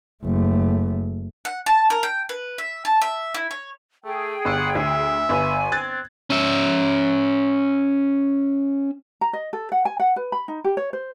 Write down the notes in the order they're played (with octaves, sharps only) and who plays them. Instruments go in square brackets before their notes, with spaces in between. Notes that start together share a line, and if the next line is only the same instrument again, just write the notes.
[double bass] F#1 A3
[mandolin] F#5
A5
A#4
G5
B4
E5
A5
E5
E4
C#5
[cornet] A3 [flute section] G#4 G5
[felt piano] G1 E6 [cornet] F#5
[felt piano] D2 [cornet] E5
[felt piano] G1 B4 [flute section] G#5
[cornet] C4 [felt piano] F#6 G#6 A6
[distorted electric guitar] C#4 E5
[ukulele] A#5
D#5
A4
F#5
G#5
F#5
B4
B5
D#4
G4
C#5
C5